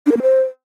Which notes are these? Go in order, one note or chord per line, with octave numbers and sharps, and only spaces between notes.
D4
A#4
A#3
C5